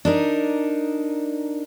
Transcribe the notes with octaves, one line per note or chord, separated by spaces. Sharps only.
D4 D#4 A#4